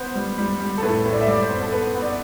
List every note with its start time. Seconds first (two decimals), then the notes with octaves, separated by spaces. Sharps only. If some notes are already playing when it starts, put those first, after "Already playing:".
Already playing: B3 C5
0.15 G3
0.38 G3
0.60 G3
0.78 A4
0.83 A2 B4
1.05 A2
1.12 D5
1.21 E5
1.27 G3 D5
1.42 C5
1.50 B3
1.62 A4
1.72 B3 B4
1.95 B3
2.02 D5